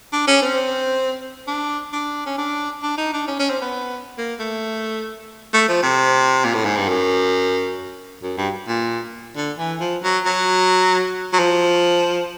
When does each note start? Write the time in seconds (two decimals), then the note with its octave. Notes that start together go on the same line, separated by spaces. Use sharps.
0.13 D4
0.27 C#4
0.42 C4
1.48 D4
1.93 D4
2.26 C#4
2.38 D4
2.83 D4
2.98 D#4
3.13 D4
3.28 C#4
3.39 C#4
3.50 C4
3.62 B3
4.18 A#3
4.40 A3
5.54 A3
5.68 F3
5.83 C3
6.44 A#2
6.55 A2
6.65 G#2
6.77 G2
6.88 F#2
8.23 F#2
8.38 G2
8.68 A#2
9.36 D3
9.58 E3
9.81 F3
10.03 F#3
10.26 F#3
11.33 F#3
11.39 F3